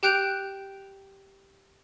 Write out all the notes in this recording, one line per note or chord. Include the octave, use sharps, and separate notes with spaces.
G4 G5 F#6 G6 D7 F7